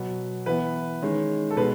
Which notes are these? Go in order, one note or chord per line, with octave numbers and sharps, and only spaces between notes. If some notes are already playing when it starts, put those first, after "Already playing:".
Already playing: B2 F#3 B3
E3 B3 B4
D#3 G#3 C#4
A4
B2 G#3 B4